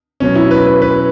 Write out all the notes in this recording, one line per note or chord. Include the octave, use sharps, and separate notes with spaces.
B2 F#3 C#4
E4
B4
B4
B4